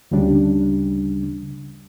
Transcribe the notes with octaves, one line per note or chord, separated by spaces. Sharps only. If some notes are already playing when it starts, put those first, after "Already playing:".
D2 C#3 G3 D4